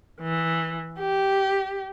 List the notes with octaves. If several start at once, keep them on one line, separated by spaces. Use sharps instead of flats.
E3
G4